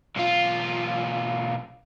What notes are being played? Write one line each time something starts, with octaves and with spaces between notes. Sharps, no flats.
B1 F4